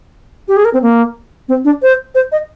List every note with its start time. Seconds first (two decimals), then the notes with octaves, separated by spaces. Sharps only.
0.48 G4
0.57 G#4
0.65 A#4
0.73 C4
0.82 A#3
1.48 C4
1.65 D4
1.82 C5
2.15 C5
2.32 D#5